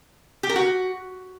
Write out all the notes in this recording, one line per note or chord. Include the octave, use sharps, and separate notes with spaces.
G4
A#4
F#4